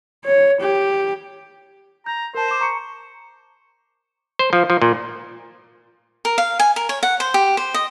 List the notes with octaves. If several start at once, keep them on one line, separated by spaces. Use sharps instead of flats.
C#5
G4
A#5 G6
A#4 C5 A5
D6 E7
A#5 C#6 C#7
C5
F3
F3
A#2
A#4
F5
G#5
A#4
C#5
F#5
C5
G4
C5
D#5